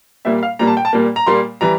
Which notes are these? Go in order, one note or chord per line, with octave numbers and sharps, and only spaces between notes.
A#2 G3 A#3 E5
F5
A#2 G3 A#3 A#5
A5
G5
A5
A#2 G3 A#3
A#5
A#2 G3 A#3 C6
E3 G3 A#5